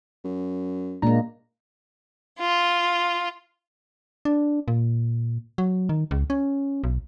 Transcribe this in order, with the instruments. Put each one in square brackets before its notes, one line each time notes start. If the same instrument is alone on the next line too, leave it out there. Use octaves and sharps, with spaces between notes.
[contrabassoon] F#2
[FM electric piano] A#2 D4 A#5 [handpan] G#3 A#3
[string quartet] F4
[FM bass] D4
A#2
F#3
D#3
C#2
C#4
B1